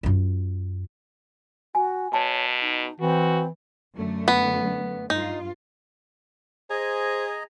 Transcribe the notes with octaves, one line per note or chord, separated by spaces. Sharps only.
F#2 F4
F#4 G#5
B2 C#5 A5
D#4
E3 C4 F#4
F#2 D3 A3
B3
G2 D#4 F4
G#4 C5 D#5 G#5 A#5